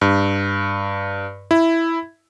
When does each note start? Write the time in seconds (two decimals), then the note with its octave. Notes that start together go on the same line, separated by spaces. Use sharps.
0.01 G2
1.51 E4